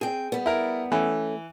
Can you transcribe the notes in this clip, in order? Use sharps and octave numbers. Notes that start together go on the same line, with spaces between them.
C4 G#4 G5
G3 B3
E4 A#4
E3 A3 C#4